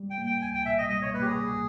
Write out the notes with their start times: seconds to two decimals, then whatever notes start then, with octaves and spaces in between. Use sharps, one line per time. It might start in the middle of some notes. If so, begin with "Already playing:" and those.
Already playing: G3
0.10 G5
0.18 A#3
0.26 G5
0.42 C#2 G#5
0.54 G5
0.65 B2 E5
0.78 D#5
0.89 G3 D#5
1.02 C#5
1.14 A#3 B4
1.22 G4
1.26 G#4
1.38 C#2